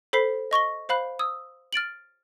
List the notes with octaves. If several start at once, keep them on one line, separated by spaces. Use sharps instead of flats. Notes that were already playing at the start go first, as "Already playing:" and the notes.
A4 C5 B5 B6 C7
D#5 C#6 A#6 G7
C5 F5 B5 F#6
D#6 E6
F6 A6 D7 F#7